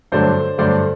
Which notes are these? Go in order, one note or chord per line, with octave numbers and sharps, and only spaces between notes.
G2 D3 F#3 A3 C5 D5
G2 D3 F#3 A3 C5 D5